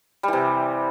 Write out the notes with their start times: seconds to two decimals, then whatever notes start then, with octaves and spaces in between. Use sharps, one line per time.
0.23 G3
0.28 E3
0.33 C3